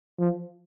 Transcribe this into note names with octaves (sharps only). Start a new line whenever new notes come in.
F3